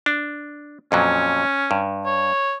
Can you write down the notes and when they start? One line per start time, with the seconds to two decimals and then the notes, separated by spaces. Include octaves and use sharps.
0.06 D4
0.92 F2 A#2 F#3 C#4
1.71 G2
2.06 C#5